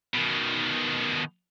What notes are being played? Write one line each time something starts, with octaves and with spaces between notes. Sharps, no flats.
B2 D#3